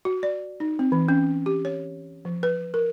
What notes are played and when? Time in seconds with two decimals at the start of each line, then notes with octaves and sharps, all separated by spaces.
0.05 F#4
0.23 D5
0.60 D#4
0.79 C4
0.92 E3
1.09 C#4
1.46 G4
1.65 C#5
2.25 F3
2.43 B4
2.74 A#4